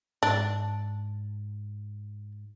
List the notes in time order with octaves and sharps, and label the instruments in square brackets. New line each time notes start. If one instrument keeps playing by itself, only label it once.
[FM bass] G#2 [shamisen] D4